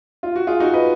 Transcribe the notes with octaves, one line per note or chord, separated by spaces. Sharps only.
F4
F#4
F4 G#4
D#4 F#4
B4 D#5